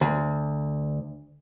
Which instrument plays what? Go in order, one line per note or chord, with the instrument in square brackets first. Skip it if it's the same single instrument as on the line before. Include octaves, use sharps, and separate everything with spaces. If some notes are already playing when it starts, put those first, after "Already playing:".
[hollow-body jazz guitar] D2